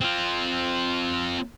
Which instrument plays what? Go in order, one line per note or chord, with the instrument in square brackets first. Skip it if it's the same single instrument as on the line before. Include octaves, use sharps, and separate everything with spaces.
[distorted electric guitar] C4 F4